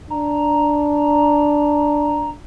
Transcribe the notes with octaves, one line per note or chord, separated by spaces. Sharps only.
D4 A#5